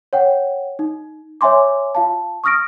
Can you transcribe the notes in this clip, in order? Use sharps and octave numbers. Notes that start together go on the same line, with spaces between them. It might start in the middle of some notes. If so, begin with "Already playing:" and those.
C#5 F#5 G5
D#4
C#5 E5 G#5 C6 D6
F4 F5 A5
C#6 D#6 F6 A#6 D7